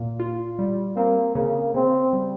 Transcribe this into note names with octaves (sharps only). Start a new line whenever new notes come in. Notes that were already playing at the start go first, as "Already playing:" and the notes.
Already playing: A#2 A#3
F4
G3
A#3 C4
C#3 A#3
C#3 C4
G3